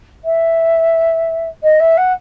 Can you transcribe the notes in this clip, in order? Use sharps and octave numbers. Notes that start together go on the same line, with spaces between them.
E5
D#5
E5
F#5